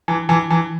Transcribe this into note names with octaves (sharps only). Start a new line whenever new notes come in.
E3
E3
E3